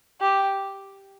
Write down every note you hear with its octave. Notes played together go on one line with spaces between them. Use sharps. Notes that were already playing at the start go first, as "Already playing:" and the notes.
G4